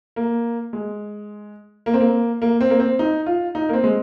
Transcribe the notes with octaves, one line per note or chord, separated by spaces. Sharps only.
A#3
G#3
A#3
C4
A#3
A#3
C4
A#3
C4
D#4
F4
D#4
A#3
C4
G#3